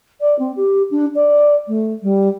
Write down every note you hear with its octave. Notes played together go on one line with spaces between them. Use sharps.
D5
C4
G4
D4
D5
A3
G3